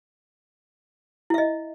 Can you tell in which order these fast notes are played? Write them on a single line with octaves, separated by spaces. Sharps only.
E4 E5 D#5